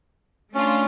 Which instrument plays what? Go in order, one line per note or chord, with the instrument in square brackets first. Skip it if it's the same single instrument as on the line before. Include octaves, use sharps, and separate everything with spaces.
[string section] A3 D4 F4 [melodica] C#4